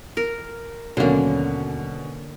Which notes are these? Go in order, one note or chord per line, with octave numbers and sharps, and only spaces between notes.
A#4
D#2 B2 D3 F#3 A#3 C#4